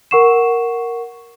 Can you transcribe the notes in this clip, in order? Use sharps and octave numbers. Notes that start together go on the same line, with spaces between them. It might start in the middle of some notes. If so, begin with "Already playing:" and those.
A#4 F#5 C#6 C7 E7